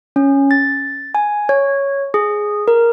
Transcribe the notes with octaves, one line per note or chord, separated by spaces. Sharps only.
C#4
A6
G#5
C#5
G#4
A#4